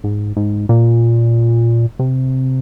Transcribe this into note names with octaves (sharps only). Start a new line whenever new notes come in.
G#2
G#2
A#2
C3